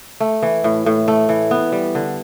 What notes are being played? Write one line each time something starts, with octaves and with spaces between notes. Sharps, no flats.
A3
E3
A2
A2
A3
E3
B3
G3
D3